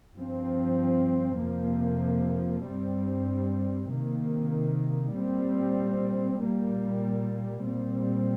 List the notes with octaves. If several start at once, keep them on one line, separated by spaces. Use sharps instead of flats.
G2 F3 C4
F2 C3 F3 A#3
G2 G3 C4
C3 D#3 A#3
A#2 G3 C4
A#2 G3 A#3
A#2 G3 C4